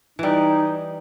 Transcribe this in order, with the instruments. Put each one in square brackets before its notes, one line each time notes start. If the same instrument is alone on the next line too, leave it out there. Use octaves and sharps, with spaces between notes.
[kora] E3 G3 [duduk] D#4